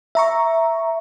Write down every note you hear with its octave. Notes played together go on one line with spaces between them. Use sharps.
E5 A#5 C#6